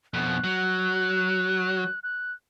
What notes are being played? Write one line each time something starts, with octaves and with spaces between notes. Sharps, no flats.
F2 B2 F#6
F#3
F#6